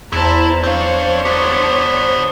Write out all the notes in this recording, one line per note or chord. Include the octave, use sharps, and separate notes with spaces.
E2 E4 C5 A5 A#5
C4 D4 C5 C#5 F5
B3 G4